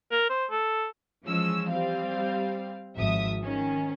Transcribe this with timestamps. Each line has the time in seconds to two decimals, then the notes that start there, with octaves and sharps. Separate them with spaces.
0.12 A#4
0.29 C5
0.50 A4
1.25 E3 F3 G#3 C#4 E6
1.70 G3 C4 F5
2.95 G#1 F3 E5 D#6
3.43 D#3 C#4